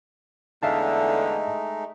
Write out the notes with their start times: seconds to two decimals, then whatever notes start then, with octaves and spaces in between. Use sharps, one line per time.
0.63 E2 D3 G#3 A3 D#4 E5 F5 A5